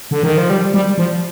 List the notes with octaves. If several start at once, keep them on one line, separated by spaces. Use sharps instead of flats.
D3
D#3
F3
G3
G3
F3